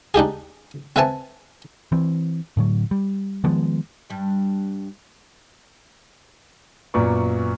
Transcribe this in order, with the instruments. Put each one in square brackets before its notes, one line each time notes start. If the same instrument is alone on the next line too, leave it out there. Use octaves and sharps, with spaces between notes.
[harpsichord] D4 D#4 G4 G#4
C4 B4 E5 G#5 A5
[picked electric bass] E3 C4
A2 D3 F#3
G3
D#3 F3 G#3 B3
[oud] G2 G3
[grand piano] F#2 A#2 B3 D5 C#6